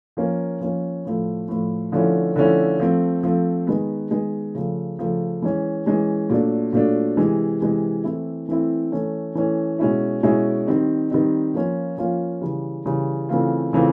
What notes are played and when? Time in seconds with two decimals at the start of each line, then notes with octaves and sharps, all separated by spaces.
0.17 F3 A#3 C#4
0.61 F3 A#3 C#4
1.05 A2 F3 A3
1.48 A2 F3 A3
1.92 D3 F3 A3 C#4 E4
2.36 D3 F3 A3 C#4 E4
2.80 F3 A3 C4
3.23 F3 A3 C4
3.67 D#3 G#3 B3
4.11 D#3 G#3 B3
4.55 C#3 F3 A3
4.98 C#3 F3 A3
5.42 E3 G#3 C#4
5.86 E3 G#3 C#4
6.30 A#2 F#3 A3 D4
6.73 A#2 F#3 A3 D4
7.17 C3 E3 G#3
7.61 C3 E3 G#3
8.04 E3 A3 C4 E4
8.49 E3 A3 C4 E4
8.92 E3 A3 C#4
9.35 E3 A3 C#4
9.79 B2 G#3 C#4 E4
10.23 B2 G#3 C#4 E4
10.67 D#3 G3 C4 D#4
11.11 D#3 G3 C4 D#4
11.54 F3 A#3 C#4 F4
11.98 F3 A#3 C#4 F4
12.41 C#3 E3 G3
12.86 C#3 E3 G3
13.29 C#3 E3 A3 C4 F4
13.73 C#3 E3 A3 C4 F4